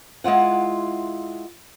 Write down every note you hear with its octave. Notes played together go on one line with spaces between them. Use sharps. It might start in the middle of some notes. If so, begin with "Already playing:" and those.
G#3 E4 F4 F#5